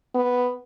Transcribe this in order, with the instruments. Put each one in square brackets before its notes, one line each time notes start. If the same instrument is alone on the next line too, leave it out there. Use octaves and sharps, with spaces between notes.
[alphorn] B3